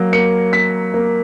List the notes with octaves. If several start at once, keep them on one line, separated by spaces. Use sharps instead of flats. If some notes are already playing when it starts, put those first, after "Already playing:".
Already playing: F#3 A#3
A#3 C#7
A#3 B6
A#3